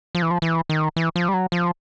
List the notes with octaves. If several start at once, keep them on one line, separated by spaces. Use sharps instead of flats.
F3
E3
F3
E3
D#3
E3
F3
G3
F#3
F3